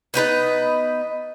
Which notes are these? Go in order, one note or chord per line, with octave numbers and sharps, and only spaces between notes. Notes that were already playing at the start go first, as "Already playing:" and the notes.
B3 D#4 B4 D#5